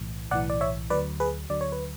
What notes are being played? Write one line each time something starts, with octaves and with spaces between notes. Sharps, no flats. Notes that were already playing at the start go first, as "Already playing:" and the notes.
Already playing: B1 A2 E3
B1 A2 E3 D5 F#5
D5
C#5 E5
D2 D3 F#3 B4 D5
G#4 B4
D2 D3 F#3 D5
C#5
B4